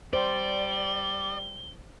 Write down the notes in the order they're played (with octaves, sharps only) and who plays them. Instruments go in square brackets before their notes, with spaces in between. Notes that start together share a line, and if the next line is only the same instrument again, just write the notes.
[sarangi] G3 [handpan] C5 [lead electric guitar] D5 [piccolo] G7